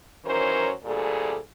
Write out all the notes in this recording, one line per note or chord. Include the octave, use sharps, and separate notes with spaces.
D#3 E3 F#3 C#4 A#4 C5
D2 A#2 G3 G#4 A4